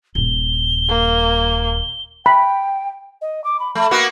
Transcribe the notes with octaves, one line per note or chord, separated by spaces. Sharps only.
D#1 G2 G7
A#3
G5 B5
D#5
D6
B5
A3 B5
A#3 B3 F#4